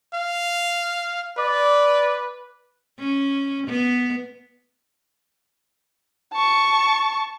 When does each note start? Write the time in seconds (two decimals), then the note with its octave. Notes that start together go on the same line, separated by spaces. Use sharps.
0.15 F5
1.38 B4 D5
2.99 C#4
3.67 B3
6.33 A5 C#6